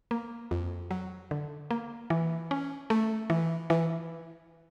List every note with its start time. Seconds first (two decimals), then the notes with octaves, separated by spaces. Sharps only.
0.11 A#3
0.51 F2
0.91 F#3
1.31 D3
1.71 A#3
2.10 E3
2.51 C#4
2.90 A3
3.30 E3
3.70 E3